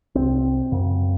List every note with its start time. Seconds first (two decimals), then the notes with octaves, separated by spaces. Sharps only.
0.15 C2 C3 C4
0.72 F#2 C#3